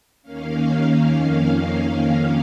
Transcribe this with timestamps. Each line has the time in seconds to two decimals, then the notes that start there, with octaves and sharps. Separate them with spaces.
0.22 D#2 D#3 A#3 C#4 F5
1.11 F2 D#3 A#3 C#4